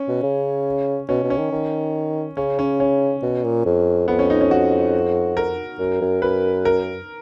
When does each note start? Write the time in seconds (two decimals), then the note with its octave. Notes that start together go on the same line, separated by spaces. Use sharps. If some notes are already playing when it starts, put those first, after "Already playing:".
Already playing: C#4
0.08 B2
0.23 C#3
1.09 B2 C#4
1.23 B2
1.30 C#4
1.37 D#3
1.52 D#3
2.37 C#3 C#4
2.59 C#4
2.80 C#4
3.23 B2
3.44 A#2
3.65 F2
4.08 F2 B3
4.19 C#4
4.30 D#4
4.41 C#4
4.51 F#4
5.37 A#4
5.79 F#2
6.01 F#2
6.22 F#2 B4
6.65 A#4